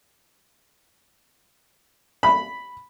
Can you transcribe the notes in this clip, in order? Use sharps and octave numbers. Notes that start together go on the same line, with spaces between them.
B5